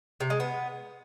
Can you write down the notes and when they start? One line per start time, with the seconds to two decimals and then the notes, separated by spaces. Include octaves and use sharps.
0.20 C3
0.30 G#3
0.40 B3